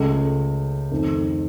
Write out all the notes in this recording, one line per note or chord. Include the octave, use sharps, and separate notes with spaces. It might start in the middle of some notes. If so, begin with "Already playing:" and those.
Already playing: C#2 C#3 A3
F2 D#3 A3 C4